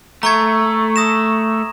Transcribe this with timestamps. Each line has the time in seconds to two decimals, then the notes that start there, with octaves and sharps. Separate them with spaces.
0.23 A3 A#5 C#6 G#6
0.96 D#6 A#6 E7